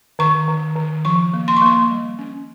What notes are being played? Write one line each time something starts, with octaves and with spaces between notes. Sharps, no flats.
D#3 C#6
D#3
D#3
F3 C#6
A#3
C6
C#6
A#3 C6
G3
C#4